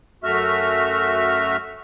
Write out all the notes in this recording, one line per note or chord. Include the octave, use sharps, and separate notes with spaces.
F#2 A3 F#4 E5 F6